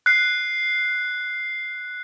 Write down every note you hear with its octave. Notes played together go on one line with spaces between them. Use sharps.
F#6 C7